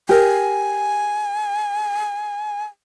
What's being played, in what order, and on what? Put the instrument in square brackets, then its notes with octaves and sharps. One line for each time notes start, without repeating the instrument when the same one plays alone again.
[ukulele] G4 A#4 [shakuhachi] G#5